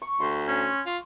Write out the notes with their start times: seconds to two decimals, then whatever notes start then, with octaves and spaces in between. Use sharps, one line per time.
0.02 C#6
0.20 D2 C6
0.48 C#4
0.86 F4